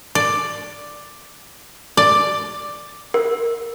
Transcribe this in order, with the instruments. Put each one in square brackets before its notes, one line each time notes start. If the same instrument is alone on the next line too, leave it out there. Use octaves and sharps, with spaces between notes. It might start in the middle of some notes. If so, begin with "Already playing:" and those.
[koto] D5
D5
[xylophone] A#4